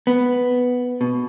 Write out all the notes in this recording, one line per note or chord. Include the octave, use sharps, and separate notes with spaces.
B3
B2